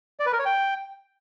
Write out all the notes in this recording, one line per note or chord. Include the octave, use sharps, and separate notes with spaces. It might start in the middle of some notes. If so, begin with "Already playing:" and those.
D5
B4
A#4
C#5
G5